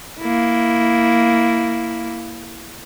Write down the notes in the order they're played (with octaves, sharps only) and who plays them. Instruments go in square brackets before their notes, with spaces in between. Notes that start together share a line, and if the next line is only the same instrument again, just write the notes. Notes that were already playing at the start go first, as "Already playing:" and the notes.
[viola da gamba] A#3 E4